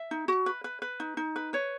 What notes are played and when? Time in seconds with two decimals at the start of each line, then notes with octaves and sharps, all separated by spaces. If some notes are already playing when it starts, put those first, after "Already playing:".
Already playing: E5
0.11 D#4
0.28 F#4
0.46 B4
0.64 B4
0.82 B4
1.00 D#4
1.17 D#4
1.36 B4
1.53 B4 C#5